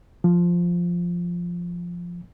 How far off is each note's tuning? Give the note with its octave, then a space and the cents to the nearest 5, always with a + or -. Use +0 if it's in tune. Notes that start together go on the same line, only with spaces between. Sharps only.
F3 +0